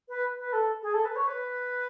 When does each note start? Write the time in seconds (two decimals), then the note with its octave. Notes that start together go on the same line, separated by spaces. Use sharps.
0.09 B4
0.38 B4
0.53 A4
0.82 G#4
0.94 A4
1.05 B4
1.16 C#5
1.27 B4